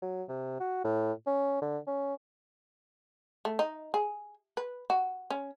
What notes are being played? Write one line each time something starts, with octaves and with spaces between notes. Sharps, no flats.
F#3
C3
F#4
A2
C#4
D3
C#4
A3
D#4
G#4
B4
F#4
C#4